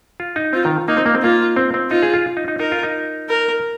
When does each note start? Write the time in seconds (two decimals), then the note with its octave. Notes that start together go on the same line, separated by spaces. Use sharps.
0.20 F4
0.36 D#4
0.53 C4 F4
0.65 D#3
0.88 A#3 D#4
0.97 C4
1.06 A#3
1.14 C4
1.23 A#3 F4
1.56 C4
1.74 C4
1.90 D#4 F4
2.03 G#4
2.14 F4
2.37 D#4
2.48 D#4
2.60 D#4 A#4
2.72 F4
2.83 D#4
3.29 A#4